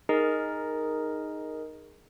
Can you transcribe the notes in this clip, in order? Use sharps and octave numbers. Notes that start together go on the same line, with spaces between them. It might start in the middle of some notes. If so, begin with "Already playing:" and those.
D#4 G#4 A#4 D#5